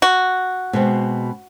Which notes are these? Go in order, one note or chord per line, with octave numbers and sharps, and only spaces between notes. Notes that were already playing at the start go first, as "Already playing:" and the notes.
F#4
B2 G#3 C4